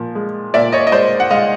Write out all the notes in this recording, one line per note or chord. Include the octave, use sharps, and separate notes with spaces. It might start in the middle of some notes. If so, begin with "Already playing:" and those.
Already playing: A#2 F3
G#3
A#2 D5 E5
C#5 D#5
D#5
G#3 C5 D5
F#5
G#3 D#5 F5